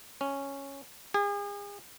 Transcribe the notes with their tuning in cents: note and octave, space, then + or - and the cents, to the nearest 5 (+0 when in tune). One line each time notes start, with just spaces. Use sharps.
C#4 -5
G#4 -40